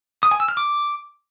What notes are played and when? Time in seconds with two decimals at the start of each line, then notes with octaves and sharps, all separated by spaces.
0.23 D#6
0.31 G#5
0.40 E6
0.48 F6
0.57 D6